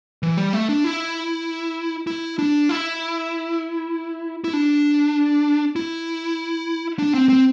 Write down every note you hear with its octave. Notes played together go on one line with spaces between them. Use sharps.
E3
G3
A3
D4
E4
E4
D4
E4
E4
D4
E4
D4
C4
C4